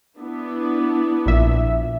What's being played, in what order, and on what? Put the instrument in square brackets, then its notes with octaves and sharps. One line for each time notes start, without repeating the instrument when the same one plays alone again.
[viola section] B3 D4 E4
[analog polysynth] A#1 A#2 E5